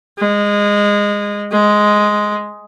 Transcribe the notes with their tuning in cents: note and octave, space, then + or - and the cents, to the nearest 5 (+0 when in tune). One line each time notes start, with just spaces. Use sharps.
G#3 -20
G#3 +5